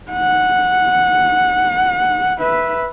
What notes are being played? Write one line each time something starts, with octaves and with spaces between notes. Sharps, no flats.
F#5
B4 E5